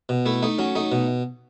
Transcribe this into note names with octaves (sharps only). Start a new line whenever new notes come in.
B2
A3 E4
A3 D#4
F#3 C#4
A3 D#4
B2